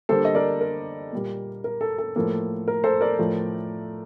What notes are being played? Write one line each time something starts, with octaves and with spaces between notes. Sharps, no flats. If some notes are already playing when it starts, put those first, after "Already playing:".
D3 G3 A#3 A4 C5
D#5
A#4 D5
A#4
A#2 G3 A#3
A#4
A4
A4
A2 F3 A#3 A4
A#4
A4 C5
A#4 D5
A2 F3 A3